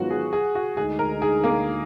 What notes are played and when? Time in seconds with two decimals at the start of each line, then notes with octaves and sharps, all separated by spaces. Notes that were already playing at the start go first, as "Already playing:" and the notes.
Already playing: G#2 D#3 F#3 B3 F4 F#4
0.10 G#4
0.33 G#4
0.55 F#4
0.77 D2 D3 G#3 D#4 G#4
0.99 A#4
1.22 G#4
1.44 A#3